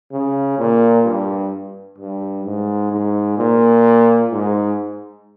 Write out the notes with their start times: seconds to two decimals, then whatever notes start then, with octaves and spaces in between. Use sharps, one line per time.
0.12 C#3
0.58 A#2
1.05 G2
1.98 G2
2.45 G#2
2.91 G#2
3.38 A#2
4.31 G#2